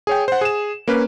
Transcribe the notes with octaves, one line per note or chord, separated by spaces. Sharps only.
G#4 C#5 G5
C5 F#5
G#4 E7
A#3 C#4 B4